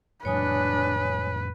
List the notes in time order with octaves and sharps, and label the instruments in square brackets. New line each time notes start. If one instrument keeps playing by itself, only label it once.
[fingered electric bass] F2 A2 F#3 [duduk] D4 [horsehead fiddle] B4 [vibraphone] C#5 G#5 D#6